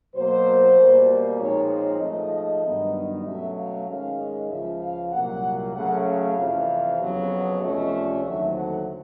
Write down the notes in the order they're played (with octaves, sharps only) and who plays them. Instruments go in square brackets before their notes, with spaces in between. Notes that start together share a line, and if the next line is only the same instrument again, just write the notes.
[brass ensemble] B2 F#3 A#3 C5
B2 G3 A#3
A#2 F3 G#3 C4 D#4 C#5
C#5
G#2 F3 A3 D#5
G2 D#3 F#3 B3 D#4
B2 F#3 A3 C#4 E5
F5
G#2 D#3 G#3 C#4 F5
D#5
C#2 C#3 F3 E5
F5
C2 A#2 F#3 A#3 F#5
C#3 F#3 A3 C#4 F#5
F5
F2 C3 E3
F2 C#3 F#3 B3
C#2 C3 F3 A3 C#4 D#5
D5
D#2 D3 F#3 A3 C4 E5
F#5